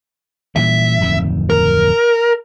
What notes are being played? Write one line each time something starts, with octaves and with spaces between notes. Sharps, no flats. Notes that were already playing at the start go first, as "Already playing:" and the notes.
A#2 E3 G3 E5
D1 F2 D#3
A#4